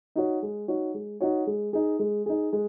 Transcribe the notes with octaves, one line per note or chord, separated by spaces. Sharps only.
D#4 F#4 C#5
G#3
D#4 F#4 C#5
G#3
D#4 F#4 C#5
G#3
D#4 G#4
G#3
D#4 G#4
G#3